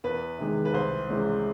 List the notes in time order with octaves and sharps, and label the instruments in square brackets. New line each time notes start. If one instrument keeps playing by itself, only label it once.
[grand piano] E2 [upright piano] B4
[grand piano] C3 D#3 G#3
[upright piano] B4
[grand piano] C2 [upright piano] C5
[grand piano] C3 E3 G#3 C#4